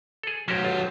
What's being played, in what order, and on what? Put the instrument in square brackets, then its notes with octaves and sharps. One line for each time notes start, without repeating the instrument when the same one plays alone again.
[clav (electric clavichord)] G#4 A4
[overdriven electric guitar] F#3 C5 [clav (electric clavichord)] C#4 F#4 G4
[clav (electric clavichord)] G1 F4